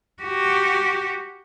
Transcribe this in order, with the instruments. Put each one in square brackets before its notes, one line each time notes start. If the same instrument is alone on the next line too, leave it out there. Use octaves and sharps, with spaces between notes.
[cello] F#4 G4